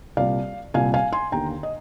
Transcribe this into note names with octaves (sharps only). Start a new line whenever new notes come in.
C2 A#2 D5 F5
C2 A#2 F5 G#5
F5 G#5
G#5 C6
D#2 D3 G5 A#5
D#5